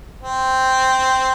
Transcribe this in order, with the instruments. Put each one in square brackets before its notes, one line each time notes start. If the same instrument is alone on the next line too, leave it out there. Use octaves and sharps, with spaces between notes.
[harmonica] C4